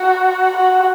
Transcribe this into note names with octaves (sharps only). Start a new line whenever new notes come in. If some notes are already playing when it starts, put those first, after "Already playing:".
Already playing: F#4
F#4